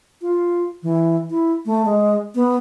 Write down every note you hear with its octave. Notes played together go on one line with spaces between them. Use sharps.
F4
E3
E4
A3
G#3
B3